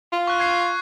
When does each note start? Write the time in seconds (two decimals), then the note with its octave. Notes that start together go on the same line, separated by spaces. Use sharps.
0.12 F4
0.27 C#6 F#6
0.40 G#6 C7